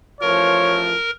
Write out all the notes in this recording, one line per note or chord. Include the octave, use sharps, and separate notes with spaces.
A1 F3 A#4 C#5